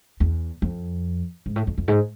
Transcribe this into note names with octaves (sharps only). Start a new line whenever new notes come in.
E2
F2
G#2
A2
F2
F2
G#2